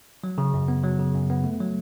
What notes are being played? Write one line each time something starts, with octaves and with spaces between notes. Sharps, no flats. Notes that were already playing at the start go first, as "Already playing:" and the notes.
F#3
C#3
F#2
B3
F#3
C#3
F#2
B3
A3
F#3